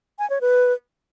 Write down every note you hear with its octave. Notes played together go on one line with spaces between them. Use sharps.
G#5
C#5
B4